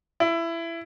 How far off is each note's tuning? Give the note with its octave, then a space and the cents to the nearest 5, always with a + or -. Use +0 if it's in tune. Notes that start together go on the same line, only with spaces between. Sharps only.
E4 +20